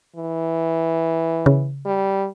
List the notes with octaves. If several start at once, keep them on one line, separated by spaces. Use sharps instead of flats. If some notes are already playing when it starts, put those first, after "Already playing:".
E3
C#3
G3